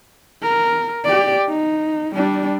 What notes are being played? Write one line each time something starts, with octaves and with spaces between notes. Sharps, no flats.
A#4
G4 D5
D#4
G3 D4